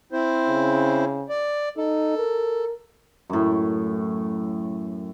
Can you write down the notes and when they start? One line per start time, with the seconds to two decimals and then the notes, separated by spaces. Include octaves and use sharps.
0.12 C4 E4 C5
0.48 C#3
1.29 D5
1.77 D#4 A4
2.18 A#4
3.30 F#2 A2